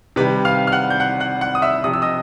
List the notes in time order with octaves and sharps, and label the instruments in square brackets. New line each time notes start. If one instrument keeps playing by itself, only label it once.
[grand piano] C3 D#3 G3 B4 B5
F5 F6
F6
F#5 F#6
G6
F#5 F#6
F#5 F#6
F#5 F#6
D#6
E5 E6
C3 F3 D#6
E6
D#5 D#6